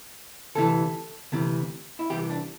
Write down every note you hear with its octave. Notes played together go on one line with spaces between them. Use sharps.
D2 C3 E3 A4
D2 C3 E3
E4
C2 C3 E3 G4
D4